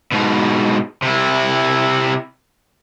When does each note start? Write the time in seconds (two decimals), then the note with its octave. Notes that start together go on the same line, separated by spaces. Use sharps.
0.12 G#2 B2
1.02 C3 E4